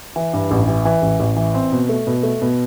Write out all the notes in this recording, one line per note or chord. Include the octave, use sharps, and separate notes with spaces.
E3
G2
A1
E3
E3
A1
A1
E3
C4
B2
A3
B2
A3
B2